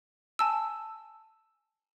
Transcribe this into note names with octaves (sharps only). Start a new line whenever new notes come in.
G#5 A5 E6